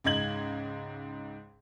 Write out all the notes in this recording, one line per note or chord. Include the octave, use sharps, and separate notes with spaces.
C#2 G#2 D#5 G#6 F#7